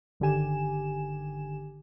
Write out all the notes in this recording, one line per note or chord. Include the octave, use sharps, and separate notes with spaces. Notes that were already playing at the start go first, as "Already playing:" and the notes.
G1 D3 D#3 G4 G#5 E7